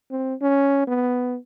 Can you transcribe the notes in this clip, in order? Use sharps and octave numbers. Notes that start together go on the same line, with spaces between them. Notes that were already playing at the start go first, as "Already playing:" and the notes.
C4
C#4
B3